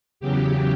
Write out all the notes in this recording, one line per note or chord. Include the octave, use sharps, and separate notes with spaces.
E2 C#3 F#3 G4